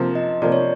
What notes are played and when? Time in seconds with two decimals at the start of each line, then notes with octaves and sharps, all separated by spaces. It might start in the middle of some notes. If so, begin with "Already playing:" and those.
Already playing: C3 F3 A#3
0.15 D#5
0.42 C3 F3 A#3 D5
0.52 C#5